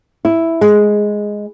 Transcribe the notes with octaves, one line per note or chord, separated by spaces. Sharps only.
E4
G#3